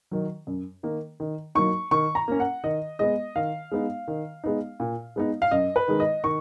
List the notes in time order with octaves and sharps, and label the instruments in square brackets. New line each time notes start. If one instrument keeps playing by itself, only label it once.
[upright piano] D#3 F#3
F#2
D#3 A#3
D#3
F#3 A#3 D#4 C#6
D#3 C#6
A#5
A#3 C#4
F#5
D#3 D#5
G#3 B3 D#5
D#3 F5
G#3 B3 D#4
D#3
G#3 B3 D#4
A#2
G#3 B3 D#4
F5
F#2 D#5
B4
D#3 G#3 D#4
D#5
D#3 C#6